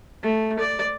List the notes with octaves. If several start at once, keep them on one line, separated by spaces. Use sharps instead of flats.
A3
D5